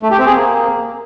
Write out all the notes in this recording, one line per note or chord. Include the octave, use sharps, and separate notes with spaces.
A3
G4
C4
G#4
A#3